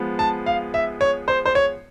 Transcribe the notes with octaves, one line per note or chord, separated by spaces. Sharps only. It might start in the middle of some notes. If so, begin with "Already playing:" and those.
Already playing: F3 G#3 B3
A5
F5
E5
C#5
C5
C5
C#5